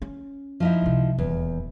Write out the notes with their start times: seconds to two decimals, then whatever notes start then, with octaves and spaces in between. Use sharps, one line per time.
0.02 C#4
0.60 F3 D#4 E4
0.82 C#2 C3
1.18 D#1 E2